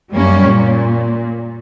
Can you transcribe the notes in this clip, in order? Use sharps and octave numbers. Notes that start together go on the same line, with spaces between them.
F#2 G3 A#3 C#4
A#2